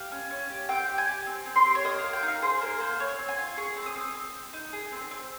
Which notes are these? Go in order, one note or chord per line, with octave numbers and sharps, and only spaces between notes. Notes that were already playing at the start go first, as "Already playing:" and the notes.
Already playing: G4 F5
C#4
C#4
G4
C4 G5
G4
G#5
G4
C4
C4
C6
G4
C#5
A#3 D#5
A#3 F5
G5
D#4
F5
G#4 C5
A#3 A#4
A#3 C5
C4 C#5
C4
G#5
F4
G#4 C#6
C4
D#6
C4
C4
C4
D#4
G#4
C4
C4